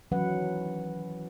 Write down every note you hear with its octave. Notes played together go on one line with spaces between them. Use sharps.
D#3 E3 F#3 C#4 B4 F#5